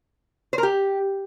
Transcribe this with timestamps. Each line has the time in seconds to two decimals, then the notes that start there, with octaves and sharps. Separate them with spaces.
0.53 C5
0.58 A#4
0.63 G4